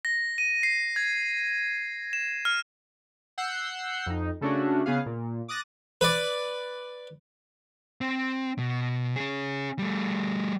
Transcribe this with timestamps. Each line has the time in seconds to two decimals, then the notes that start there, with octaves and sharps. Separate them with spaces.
0.05 A#6
0.38 D#7
0.63 C7
0.96 G#6
2.13 E7
2.45 F6
3.38 F#5 E6 F#6 G6 C7
4.06 F2 D#4
4.41 C#3 A3 C#4 D4 F#4
4.86 C#3 B3 G#4 F5
5.06 A#2
5.48 D6 D#6 F#6 A6 A#6 D#7
6.01 B4 D5
8.01 C4
8.58 B2
9.16 C#4 G#4
9.79 G3 A3